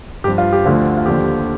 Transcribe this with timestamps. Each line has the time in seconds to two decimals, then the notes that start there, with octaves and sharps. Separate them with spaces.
0.24 G2 F3 G4
0.38 F4
0.53 G4
0.65 D2 D3 F3 F4
0.97 F4
1.06 D#2 D3 F3 G4